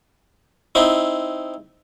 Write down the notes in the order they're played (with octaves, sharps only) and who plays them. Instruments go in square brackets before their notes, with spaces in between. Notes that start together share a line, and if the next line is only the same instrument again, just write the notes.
[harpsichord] C4 D#4 E4